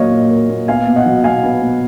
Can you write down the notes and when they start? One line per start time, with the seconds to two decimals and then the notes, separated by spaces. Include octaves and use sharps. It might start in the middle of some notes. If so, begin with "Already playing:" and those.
Already playing: A#2 F#3 A#3 C#5 D#5 F5
0.12 A#2
0.31 A#3
0.50 A#2
0.68 B3 F5 G#5
0.87 B2
0.96 D#5 F#5
1.06 F#3
1.24 B2 F5 G#5
1.43 B3
1.62 B2